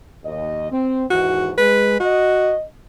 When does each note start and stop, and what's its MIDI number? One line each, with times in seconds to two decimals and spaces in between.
0.24 0.70 39
0.24 0.70 75
0.71 1.04 60
1.10 1.52 39
1.10 1.52 44
1.10 1.52 52
1.10 1.51 66
1.58 1.99 56
1.58 1.95 71
2.00 2.53 66
2.00 2.65 75